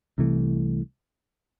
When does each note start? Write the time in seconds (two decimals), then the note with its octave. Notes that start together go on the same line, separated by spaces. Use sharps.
0.18 C2 C3 E3 A3